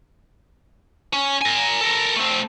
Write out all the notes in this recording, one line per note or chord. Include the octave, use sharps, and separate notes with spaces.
C#4
A#4 G#5
A4 A#4
A3 C4